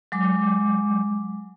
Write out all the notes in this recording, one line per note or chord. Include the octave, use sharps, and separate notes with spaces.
F#3 G#3 D6